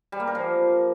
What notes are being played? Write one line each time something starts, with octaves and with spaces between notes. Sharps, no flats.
G3
A#3
A#4
F3